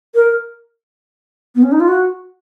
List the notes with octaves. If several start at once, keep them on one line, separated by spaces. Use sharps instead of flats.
A#4
B3
C#4
D#4
F4
F#4